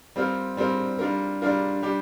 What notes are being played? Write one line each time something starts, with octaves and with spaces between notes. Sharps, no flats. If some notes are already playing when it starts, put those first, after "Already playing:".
G3 C4 F4 A#4
G3 C4 F4 A#4
G3 D4 F4 A#4
G3 D4 F4 A#4
G3 D4 G4